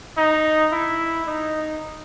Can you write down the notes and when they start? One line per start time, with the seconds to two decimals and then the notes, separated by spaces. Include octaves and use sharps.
0.18 D#4
0.72 E4
1.27 D#4